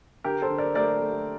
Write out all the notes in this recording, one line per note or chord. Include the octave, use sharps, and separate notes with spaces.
D3 G4 A#4
A4 C5
D3
A#4 D5
A3 A#4 D5
A3